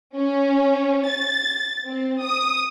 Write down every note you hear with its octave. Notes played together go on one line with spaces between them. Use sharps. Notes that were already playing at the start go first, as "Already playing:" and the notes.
C#4
A6
C4
D#6